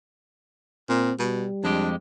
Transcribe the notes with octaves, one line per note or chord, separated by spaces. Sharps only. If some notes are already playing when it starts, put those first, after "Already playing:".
A#2 C4
B2 G3
F2 G#3 D4 G4